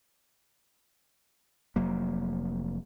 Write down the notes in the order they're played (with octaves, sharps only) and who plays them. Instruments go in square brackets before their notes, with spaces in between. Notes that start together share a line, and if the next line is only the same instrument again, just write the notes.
[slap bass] F1 F#3 A#3